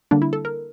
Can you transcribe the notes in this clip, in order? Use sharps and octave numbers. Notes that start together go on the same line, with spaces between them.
D3 G3 A#3 D4
E4
A4
A#4